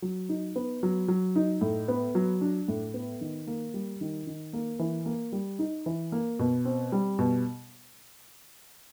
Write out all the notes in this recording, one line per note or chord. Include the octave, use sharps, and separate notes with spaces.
F#3
D#4
B3
F#3
F#3
D#4
A2
B3
F#3
D4
A2
B3
D#3
A#3
G3
D#3
D#3
A#3
E3
A#3
G3
D#4
E3
A#3
B2
C4
G3
B2